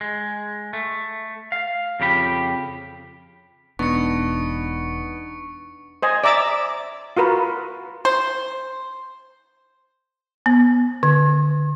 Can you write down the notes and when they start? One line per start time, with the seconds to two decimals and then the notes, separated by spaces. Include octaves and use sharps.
0.01 G#3
0.73 A3
1.52 F5
2.00 F2 C#3 G4 B5
3.79 E1 B3 D4 D#4 C#6 C#7
6.02 C5 D#5 G#5
6.24 D5 E5 A#5 D6 E6
7.17 F4 F#4 A#4 B4
8.05 C5
10.46 B3
11.03 D3